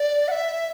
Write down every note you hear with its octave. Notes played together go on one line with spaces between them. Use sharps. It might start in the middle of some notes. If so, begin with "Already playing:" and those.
Already playing: D5
F#5
E5